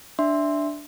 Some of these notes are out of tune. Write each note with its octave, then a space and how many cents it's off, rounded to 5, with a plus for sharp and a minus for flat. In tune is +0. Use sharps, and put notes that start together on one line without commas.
D4 +0 E5 +0 C6 +0